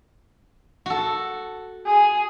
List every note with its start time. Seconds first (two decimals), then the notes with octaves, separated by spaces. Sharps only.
0.86 F#4 A4
1.86 G#4